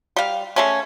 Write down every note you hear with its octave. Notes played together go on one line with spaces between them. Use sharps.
G3 F5
G#3 A3 C#4